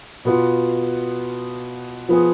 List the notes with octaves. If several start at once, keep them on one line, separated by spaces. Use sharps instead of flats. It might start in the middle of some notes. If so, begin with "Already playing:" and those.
B2 B3 F4
F3 B3 F4 G#4